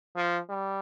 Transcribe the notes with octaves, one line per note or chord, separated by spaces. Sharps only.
F3
G3